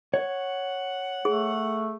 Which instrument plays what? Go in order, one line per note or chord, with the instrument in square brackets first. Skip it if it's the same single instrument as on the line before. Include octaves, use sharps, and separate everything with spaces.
[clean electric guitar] C#5 [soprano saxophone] F#5
[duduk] A3 [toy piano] G#4